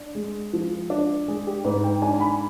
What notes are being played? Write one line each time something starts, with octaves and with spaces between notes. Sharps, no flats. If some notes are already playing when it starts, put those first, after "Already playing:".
Already playing: D4
G#3
F3
D4
G#3 G#4
G4
G#2 B4
G5
D4 G#5
G#5
B5